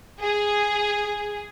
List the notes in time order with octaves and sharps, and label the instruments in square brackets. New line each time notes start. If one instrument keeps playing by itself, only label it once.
[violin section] G#4